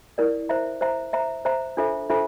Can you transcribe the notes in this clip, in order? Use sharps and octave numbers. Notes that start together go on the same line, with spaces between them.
E4 A#4 D5
C5 E5 A#5
C5 E5 A#5
C5 E5 A#5
C5 E5 A#5
D4 F4 A4 C5 E5
D4 F4 A4 C5 E5